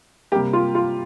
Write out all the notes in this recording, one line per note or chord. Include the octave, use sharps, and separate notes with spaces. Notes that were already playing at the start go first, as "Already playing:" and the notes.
C3 G3 A#3 G4
F4
F4